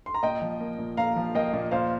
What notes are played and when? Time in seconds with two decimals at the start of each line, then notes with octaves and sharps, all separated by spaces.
0.06 C6
0.14 A#5
0.23 A#2 D#5 G5
0.42 F3
0.61 A#3
0.78 A#2
0.97 A#2 F5 A#5
1.16 F3
1.35 A#3 D#5 G5
1.53 A#2
1.71 A#2 C5 F5